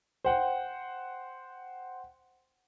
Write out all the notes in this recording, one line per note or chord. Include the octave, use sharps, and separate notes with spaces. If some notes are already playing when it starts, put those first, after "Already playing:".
C5 F#5 G5